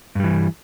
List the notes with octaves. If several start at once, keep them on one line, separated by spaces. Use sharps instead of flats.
G2 E3 G3